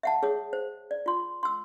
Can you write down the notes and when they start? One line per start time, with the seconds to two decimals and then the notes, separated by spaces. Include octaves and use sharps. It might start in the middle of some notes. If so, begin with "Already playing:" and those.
0.03 E5 F#5 A5
0.23 G#4 C#5 D#6
0.53 C5
0.91 D5
1.06 F4 C6
1.43 C6 E6